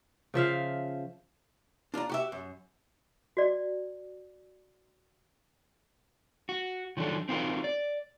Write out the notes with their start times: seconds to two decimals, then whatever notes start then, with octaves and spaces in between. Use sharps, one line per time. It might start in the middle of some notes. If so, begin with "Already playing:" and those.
0.34 C#3 F3 E5 F5
1.94 D4 F4 D5 A#5
2.09 F#4 G4 E5
2.32 F#2
3.37 F#4 D5
6.49 F#4
6.97 D#3 F3 F#3 D4 A4
7.29 C4 D#4 F4 F#4 A#4
7.64 D5